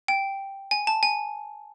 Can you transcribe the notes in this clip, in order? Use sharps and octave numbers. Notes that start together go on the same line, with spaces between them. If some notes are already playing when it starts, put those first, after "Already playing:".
G5
G#5
A5
G#5